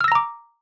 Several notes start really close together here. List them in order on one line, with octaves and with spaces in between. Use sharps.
F6 E6 A#6 A#5 D6